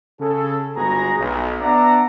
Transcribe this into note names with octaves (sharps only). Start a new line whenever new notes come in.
C#3 G#4 A4
G1 G#3 B3 F#4 G#4 A#5
B1
B3 D4 D5 E5 F#5 A#5